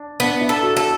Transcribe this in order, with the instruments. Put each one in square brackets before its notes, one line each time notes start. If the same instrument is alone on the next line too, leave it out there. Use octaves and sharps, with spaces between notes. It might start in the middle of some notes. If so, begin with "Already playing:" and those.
Already playing: [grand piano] D4
[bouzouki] B3 [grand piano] D4
[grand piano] E4
[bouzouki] A4
[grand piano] F#4
[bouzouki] A4